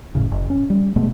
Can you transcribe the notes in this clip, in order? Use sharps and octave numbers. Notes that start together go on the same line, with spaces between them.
F#1 B1 A2 C#3
F#1
C#4
G3
B2 G#3 A3 B3